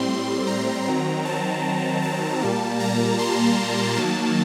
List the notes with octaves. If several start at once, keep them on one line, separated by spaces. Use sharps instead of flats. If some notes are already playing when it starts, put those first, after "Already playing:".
Already playing: A2 G3 C4 C6
A#5
D#3 F#3 C4
A5
A5
A#2 G3 A#3
A#5
C6
D#3 F#3 A#3 A5